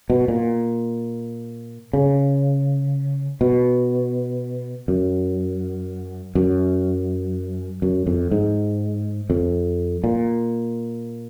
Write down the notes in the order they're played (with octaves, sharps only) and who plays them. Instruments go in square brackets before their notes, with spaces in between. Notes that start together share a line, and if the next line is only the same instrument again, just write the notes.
[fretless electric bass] B2
A#2
C#3
B2
F#2
F#2
F#2
F2
G#2
F2
A#2